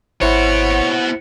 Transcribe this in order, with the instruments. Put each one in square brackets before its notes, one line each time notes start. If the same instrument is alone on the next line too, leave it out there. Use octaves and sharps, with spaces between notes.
[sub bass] G#1 [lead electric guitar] B3 F#4 [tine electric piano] E4 C5 [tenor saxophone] C#5